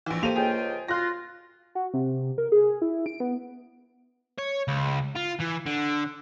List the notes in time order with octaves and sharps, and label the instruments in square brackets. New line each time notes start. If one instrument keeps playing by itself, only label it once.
[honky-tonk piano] A#1 E3
[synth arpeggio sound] A#3 [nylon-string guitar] G4 A4 C5 [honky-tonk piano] D#7 F7
[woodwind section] C#2 F4 G5 [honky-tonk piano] G#4
[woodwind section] F4 [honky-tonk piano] F#6 A#6
[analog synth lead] F#4
C3
A#4
G#4
E4
D7
B3
[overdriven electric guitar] C#5
C#2
F4
E3
D3